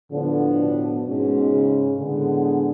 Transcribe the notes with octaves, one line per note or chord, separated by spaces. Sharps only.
A2 D3 F3 B3 D4
B2
G#2 B2 G#3 C#4
C#3
A2 D3 G#3 B3